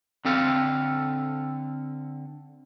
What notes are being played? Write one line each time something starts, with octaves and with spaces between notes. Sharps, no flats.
D3 C4 A4 F5